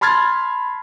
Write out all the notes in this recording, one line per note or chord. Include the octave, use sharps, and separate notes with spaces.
A5 B5 C6 F6 G#6 A6